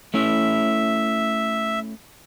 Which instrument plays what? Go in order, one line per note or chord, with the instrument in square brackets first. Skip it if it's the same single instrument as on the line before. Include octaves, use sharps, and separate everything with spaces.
[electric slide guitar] A3 C#4 E4 [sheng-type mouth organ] E5